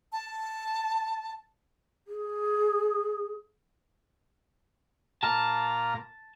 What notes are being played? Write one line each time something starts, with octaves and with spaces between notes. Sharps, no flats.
A5
G#4
A#2 F4 A5 A#5